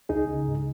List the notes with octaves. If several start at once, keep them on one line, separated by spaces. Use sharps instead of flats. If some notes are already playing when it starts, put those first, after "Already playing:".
C#2 D#4 G#4
C#3
G#2